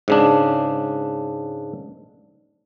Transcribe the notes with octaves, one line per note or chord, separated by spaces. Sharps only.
G#2 C#3 D4